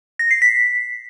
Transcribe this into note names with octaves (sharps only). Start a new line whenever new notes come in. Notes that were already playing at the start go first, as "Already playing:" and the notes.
A#6
C7
B6